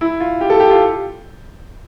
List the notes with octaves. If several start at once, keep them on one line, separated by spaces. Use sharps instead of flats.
E4
F4
G4
A4
G4
F4